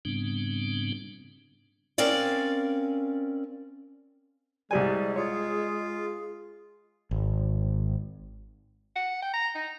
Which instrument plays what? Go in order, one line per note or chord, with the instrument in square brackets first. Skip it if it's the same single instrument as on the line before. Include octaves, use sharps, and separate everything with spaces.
[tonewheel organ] G#2 C#3 G3 B3 C4 D4
[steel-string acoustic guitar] C4 C#4 A#4 D5 F5
[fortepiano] C2 G3 G#5 [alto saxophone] G#3 [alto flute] D5
[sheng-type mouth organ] F4 [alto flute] G#4 [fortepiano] C#5
[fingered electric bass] G#1
[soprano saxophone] F#5
G5
A#5
D#4